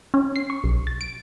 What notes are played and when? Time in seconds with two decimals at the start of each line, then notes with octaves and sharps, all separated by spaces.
0.14 C#4
0.36 C7
0.50 C#6
0.64 B1
0.87 A6
1.01 D7